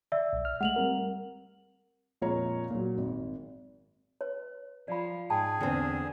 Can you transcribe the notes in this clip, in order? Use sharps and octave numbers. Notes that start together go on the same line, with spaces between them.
D5 E5 E6
B1
F6
G#3 A3 F#5 F7 F#7
G3 C4 A#4
F2 A#2 G#3 F4 C#5 A#5
A#2 F#3
G#1
B4 C#5
F3 D5 B5
G#2 G#4 G5 A5 B5
E2 D3 C4